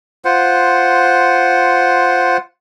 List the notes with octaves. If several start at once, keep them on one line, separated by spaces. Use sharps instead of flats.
F4 C5 F#5